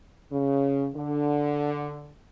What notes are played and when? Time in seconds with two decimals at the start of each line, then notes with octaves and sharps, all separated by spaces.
0.32 C#3
0.95 D3